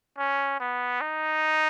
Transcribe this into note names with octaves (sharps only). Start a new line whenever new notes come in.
C#4
B3
D#4